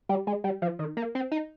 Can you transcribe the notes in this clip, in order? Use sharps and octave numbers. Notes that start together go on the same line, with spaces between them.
G3
G#3
G3
F3
D#3
A#3
C4
D#4